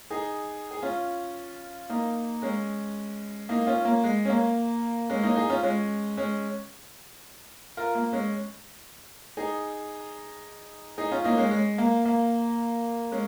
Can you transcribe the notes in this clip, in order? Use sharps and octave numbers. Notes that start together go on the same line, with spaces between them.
D#4 G#4
G#4
C#4 F4
A#3 D#4
G#3 C#4
A#3 D#4
C#4 F4
A#3
G#3
C#4
A#3
G#3 C#4
A#3 D#4
D#4 G#4
C#4 F4
G#3 C#4
G#3 C#4
F4 A#4
A#3
G#3 C#4
D#4 G#4
D#4 G#4
C#4 F4
A#3 D#4
G#3 C#4
G#3
A#3
A#3
G#3 C#4